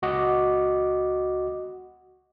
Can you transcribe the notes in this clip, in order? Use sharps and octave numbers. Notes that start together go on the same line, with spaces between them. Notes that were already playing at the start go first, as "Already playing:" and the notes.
C#2 F#4 D#5 F#5 D6